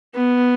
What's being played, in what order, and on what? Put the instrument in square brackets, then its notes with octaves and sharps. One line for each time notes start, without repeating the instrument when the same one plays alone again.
[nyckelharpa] B3